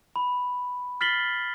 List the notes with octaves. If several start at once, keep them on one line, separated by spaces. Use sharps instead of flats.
B5
F6 A6 B6 C7 F#7 G7